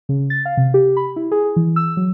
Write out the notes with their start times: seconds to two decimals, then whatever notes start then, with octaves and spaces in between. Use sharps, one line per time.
0.09 C#3
0.30 A6
0.45 F5
0.57 C3
0.74 G4
0.97 B5
1.16 E4
1.31 G#4
1.56 E3
1.76 E6
1.97 F#3